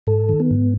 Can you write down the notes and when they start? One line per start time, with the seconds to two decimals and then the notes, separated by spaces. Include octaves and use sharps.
0.07 G#2 A4
0.29 D#3
0.40 B3
0.51 G#2